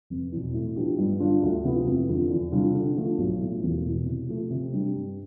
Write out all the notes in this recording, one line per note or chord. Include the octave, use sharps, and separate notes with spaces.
F1
E2 B2
A2
F3 B3 D4 G4
G2
D3 G3 D4 F4
D2
C3 F3 B3 E4
F1
F2 D3
E2
C3 G3 D4 F4
D3
F3 A3 D4
B1
A2 F3
E1
E2 B2
C3
F3 A3
C3
G3 D4 G4
G2